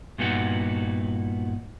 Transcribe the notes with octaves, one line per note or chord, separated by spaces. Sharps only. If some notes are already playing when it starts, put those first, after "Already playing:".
G2 A#2 B3 D#4 F#4